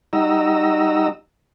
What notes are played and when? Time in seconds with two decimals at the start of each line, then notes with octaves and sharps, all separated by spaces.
0.13 G3 D#4 F#4 D#5 A#5 E6